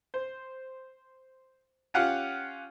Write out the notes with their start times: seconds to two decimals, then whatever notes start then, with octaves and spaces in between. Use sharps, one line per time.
0.14 C5
1.94 C#4 F4 G4 F5 F#5